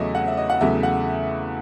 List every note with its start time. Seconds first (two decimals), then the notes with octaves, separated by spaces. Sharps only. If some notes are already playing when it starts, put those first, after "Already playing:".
Already playing: E2 C#3 F#3 A3 C#5 D#5 E5
0.15 F#5
0.28 E5
0.37 D#5
0.50 F#5
0.61 E2 C#3 F#3 A3 E5
0.83 F#5